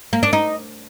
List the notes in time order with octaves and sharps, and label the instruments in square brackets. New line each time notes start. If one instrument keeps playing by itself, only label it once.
[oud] A#3
D4
D#4